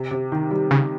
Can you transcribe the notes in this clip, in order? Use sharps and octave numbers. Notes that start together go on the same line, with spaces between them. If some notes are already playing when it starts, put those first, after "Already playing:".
Already playing: C3
C3
D#3
G3
C#3